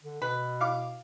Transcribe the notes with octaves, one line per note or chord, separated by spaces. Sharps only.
D3
B2 B4
F5 D6